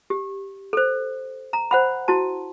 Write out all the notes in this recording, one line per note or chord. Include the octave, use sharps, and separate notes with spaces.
G4
A4 C5
A#5
C5 F#5 B5
E4 F#4 A5